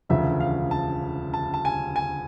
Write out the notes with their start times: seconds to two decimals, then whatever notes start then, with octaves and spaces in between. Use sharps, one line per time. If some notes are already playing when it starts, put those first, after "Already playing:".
0.09 E1 D2 C#3 F3 E5
0.40 F5
0.71 A5
1.34 A5
1.54 A5
1.65 G#5
1.96 G#5